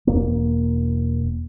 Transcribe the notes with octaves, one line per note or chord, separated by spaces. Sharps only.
E1 E2 A#3